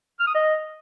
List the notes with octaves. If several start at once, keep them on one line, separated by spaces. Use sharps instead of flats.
F6
D#6
D#5